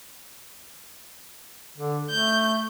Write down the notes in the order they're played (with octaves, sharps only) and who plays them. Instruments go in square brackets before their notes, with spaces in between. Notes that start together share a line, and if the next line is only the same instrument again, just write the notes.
[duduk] D3
[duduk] A3 [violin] G6